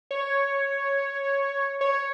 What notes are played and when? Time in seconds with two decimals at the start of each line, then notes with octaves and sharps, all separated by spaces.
0.11 C#5
1.81 C#5